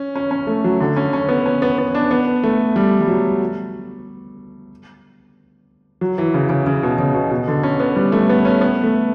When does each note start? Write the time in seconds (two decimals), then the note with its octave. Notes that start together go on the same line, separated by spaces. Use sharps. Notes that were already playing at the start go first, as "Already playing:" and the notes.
Already playing: C#4
0.15 C#4
0.31 C#4
0.47 A3
0.64 F#3
0.80 D3
0.96 C#4
1.13 C#4
1.29 B3
1.46 C#4
1.62 B3
1.78 B3
1.95 D4
2.11 B3
2.43 A3
2.76 G3
3.01 G3
3.07 F#3
6.01 F#3
6.18 E3
6.34 C#3
6.49 C#3
6.67 C#3
6.83 B2
6.99 C#3
7.14 B2
7.31 B2
7.48 D3
7.63 C#4
7.80 B3
7.96 G3
8.12 A3
8.29 B3
8.45 C#4
8.61 B3
8.83 A3